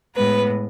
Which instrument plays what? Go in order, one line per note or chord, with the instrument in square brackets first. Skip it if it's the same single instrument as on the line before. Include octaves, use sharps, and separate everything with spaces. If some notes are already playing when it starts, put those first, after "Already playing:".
[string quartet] A2 G#3 B3 B4